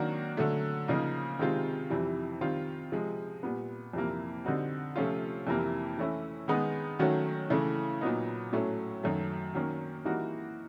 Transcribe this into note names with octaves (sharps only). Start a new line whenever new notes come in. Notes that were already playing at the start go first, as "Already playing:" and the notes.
Already playing: D#3 F#3 A#3 D4 F#4
D3 F#3 A3
C#3 F3 A#3 D#4
C3 D#3 G#3 C4 F4
F2 C3 E3 G3
D#3 G3 C4 F4
C3 F3 G#3
A#2 G3 B3
F2 C3 E3 G3 A#3
D3 G3 C4 D#4 F#4
C3 F3 A3 C#4 F4
F2 C3 E3 G3 A#3
E3 A3 C#4 E4
D#3 G#3 B3 D#4
D#3 F#3 A3 C#4 F#4
C#3 E3 A3
A#2 F#3 B3 D#4
A2 F#3 A3 C#4
F#2 D#3 F#3 A3
D#3 F#3 A#3 C#4
E3 G3 A#3 D#4 F#4